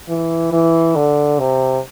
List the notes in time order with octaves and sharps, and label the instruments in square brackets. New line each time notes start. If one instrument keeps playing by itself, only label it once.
[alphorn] E3
E3
D3
C3